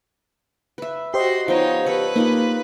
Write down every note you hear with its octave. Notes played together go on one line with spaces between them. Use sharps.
B4 E5
F#4 G4 C5 D#5 C6
F3 B3 D#4 C#5 G5
A4 B4 C#5
A#3 D#4 F4 G4